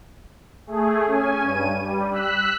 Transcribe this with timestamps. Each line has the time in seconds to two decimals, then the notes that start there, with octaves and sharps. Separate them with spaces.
0.67 A3 G#4
1.06 C#4 G#5
1.43 G2 D#7
1.78 G3
2.11 E6 F#6 B6